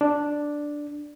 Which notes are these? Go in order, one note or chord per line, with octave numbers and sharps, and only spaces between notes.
D4